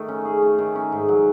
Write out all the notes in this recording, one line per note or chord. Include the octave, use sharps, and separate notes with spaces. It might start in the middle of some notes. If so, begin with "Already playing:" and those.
Already playing: D#3 A3
C#4
G#4
A3
D#3
C#4
G#2
F#3